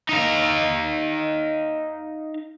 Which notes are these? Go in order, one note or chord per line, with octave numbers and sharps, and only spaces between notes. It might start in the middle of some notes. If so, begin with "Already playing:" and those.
D#4 F5